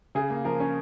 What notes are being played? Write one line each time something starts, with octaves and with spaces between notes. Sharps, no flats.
C#3 G#4
A#3
F3 A#4
C#4